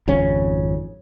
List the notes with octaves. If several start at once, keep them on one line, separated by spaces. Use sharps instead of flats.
G#1 F2 C#3 C#4